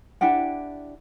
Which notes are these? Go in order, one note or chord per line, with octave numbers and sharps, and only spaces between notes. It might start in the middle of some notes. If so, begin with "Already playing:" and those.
D4 E4 G4 F#5